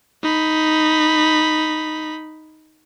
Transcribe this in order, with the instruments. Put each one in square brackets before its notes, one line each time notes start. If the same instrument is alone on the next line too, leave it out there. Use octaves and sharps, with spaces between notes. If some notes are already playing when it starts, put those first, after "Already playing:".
[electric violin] D#4 B5